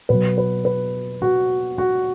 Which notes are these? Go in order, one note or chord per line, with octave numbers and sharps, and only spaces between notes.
B2 F#3 B4
B4
B4
F#4
F#4